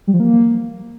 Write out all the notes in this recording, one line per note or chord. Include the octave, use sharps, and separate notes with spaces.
G3
F3
A#3